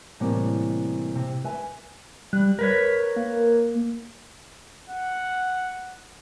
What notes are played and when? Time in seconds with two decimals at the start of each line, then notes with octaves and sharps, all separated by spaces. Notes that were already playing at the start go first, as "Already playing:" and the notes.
0.20 A2 C3 E3 G3 A#3 B3
1.15 C3
1.44 B4 E5 G#5
2.33 G3 F#6
2.59 A#4 B4 C#5 B6
3.16 A#3
4.90 F#5